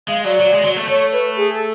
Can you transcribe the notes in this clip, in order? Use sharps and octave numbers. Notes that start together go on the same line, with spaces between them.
G#3 F5
F#3 D5
F#3
G#3
F#3
A3
A3 C#5
B4
G#4
A4